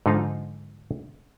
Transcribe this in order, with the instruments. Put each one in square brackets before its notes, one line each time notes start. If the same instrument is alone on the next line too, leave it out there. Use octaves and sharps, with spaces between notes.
[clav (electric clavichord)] G#2 D3 F3 D#4 F4 F5